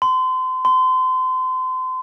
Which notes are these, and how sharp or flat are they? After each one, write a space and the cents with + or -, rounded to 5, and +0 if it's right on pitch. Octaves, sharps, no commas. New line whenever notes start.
C6 -30
C6 -30